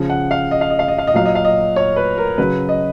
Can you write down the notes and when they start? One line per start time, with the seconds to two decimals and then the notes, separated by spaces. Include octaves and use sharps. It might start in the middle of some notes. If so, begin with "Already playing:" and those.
Already playing: C#3 F3
0.10 F#5
0.31 F5
0.51 D#5
0.61 F5
0.70 D#5
0.79 F5
0.88 D#5
0.98 F5
1.07 D#5
1.14 A#2 F#3 F5
1.26 D#5
1.35 F5
1.45 D#5
1.76 C#5
1.96 B4
2.18 A#4
2.38 C#3 F#3 B4
2.69 D#5